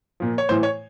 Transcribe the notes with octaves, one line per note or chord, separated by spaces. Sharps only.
A#2 F3
C#5
A2 E3 C5
C#5